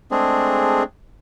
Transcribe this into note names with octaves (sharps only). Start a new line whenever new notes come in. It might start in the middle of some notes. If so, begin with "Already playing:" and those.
G#3 A3 C4 D4 G#4